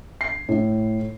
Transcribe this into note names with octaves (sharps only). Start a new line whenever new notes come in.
C7
A2